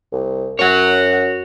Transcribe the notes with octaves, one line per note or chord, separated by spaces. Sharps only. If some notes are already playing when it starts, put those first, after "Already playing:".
C2
F#2 F#4 C#5 F#5